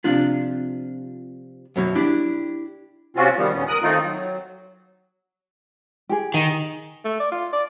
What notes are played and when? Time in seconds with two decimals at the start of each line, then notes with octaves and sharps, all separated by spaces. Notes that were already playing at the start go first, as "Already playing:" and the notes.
0.04 C3 F3 D4 F4
1.76 F#2 B2 F#3
1.95 D4 E4 G4
3.17 C3 C4 C#4 F4 F#4
3.37 D#3 F3 G3 B3
3.53 D2 A#2 C#3 B3 C#4
3.68 A#4 D#6 F#6
3.83 D#3 A3 C4 D#4 F4
4.03 F#3
6.09 G4 G#4
6.34 D#3
7.05 A3
7.20 D5
7.32 F4
7.53 D5